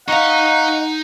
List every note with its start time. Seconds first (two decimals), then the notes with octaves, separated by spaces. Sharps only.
0.08 D#4 D#5 F5 F#5 A#5 C#6